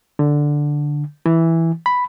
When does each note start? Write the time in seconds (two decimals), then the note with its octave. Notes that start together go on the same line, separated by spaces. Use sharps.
0.19 D3
1.26 E3
1.86 B5